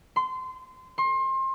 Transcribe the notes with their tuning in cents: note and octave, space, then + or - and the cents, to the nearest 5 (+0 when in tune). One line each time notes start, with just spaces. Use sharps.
C6 -25
C6 +30